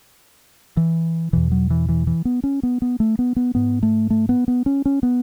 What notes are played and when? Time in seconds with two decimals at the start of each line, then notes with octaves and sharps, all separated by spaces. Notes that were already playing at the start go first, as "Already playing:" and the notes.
0.77 E3
1.33 E2 B2 E3
1.52 F#3
1.71 E3
1.89 E3
2.07 E3
2.25 B3
2.44 C#4
2.63 B3
2.82 B3
3.00 A3
3.19 B3
3.36 B3
3.55 G#2 B3
3.83 A3
4.10 A3
4.29 B3
4.48 B3
4.66 C#4
4.85 C#4
5.03 B3